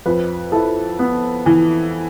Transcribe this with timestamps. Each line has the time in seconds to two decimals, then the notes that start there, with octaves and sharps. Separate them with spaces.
0.06 F2 B4
0.52 E4 A4
0.99 B3
1.46 E3